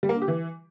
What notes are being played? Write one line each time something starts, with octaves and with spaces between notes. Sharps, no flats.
G3
A#3
D3
G4
E3